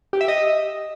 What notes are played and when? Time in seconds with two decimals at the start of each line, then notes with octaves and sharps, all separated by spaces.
0.13 G4
0.21 E5
0.28 D#5